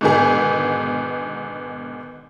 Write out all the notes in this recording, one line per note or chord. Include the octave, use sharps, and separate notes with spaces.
G#2 B2 D3 D#3 B3 G#4